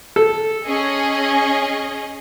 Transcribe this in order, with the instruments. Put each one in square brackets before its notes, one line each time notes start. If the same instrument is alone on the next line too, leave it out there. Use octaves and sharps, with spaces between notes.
[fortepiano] A4
[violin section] C#4 G#4 D#5